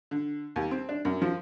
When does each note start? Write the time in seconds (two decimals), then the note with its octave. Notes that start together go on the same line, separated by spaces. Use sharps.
0.11 D3
0.56 D#2
0.71 C4
0.89 D4
1.05 F#2
1.22 F3